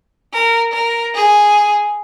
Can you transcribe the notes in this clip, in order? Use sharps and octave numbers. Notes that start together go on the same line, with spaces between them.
A#4
A#4
G#4